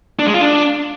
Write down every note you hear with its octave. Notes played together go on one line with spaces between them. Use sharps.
D4
G#3
F4
D4